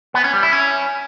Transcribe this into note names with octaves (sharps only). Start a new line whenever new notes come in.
B3
C#4
G3
E4
C#4